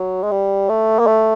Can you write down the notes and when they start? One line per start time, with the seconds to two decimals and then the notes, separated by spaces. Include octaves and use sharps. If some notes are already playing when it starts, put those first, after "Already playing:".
Already playing: F#3
0.23 G#3
0.31 G3
0.69 A3
0.99 A#3
1.07 A3